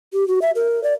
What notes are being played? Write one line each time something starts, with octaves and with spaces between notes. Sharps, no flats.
G4
F#4
E5
A#4
D5